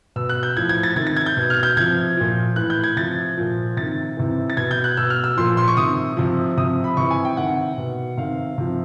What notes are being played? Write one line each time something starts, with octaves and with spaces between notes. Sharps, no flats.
B2 E6
F#6
G6
A2 F3 G#6
G#6
A6
C3 D#3 G#6
A6
G#6
G6
B2
F6
G6
C3 F3 G#6
A#2 F3
A2 E3 F#6
G6
G#6
C3 F3 A6
A#2 F3
C3 D#3 A6
C3 E3
A6
B2 G#6
G6
F#6
B2 E6
F6
E6
A#2 F3 C6
C6
C#6
C3 D#3 D#6
C3 F3
C3 F3 D#6
B5
C3 E3 C#6
G#5
G5
C3 D#3 F#5
B2
C3 D#3 F5
C3 F3